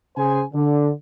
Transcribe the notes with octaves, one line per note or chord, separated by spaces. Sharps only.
C#3 G#4 C5 G#5
D3